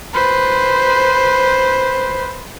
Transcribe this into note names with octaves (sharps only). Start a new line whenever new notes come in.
B4 C5